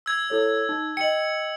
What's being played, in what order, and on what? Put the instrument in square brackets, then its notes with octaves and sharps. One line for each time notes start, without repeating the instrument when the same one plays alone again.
[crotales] E6 G#6
[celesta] E4 A4 C#5
D#4
[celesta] D#5 G5 [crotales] C#7 F#7